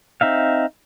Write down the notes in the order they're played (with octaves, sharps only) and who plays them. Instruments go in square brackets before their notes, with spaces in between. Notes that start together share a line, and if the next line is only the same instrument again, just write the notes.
[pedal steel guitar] C4 D#4 E5 F5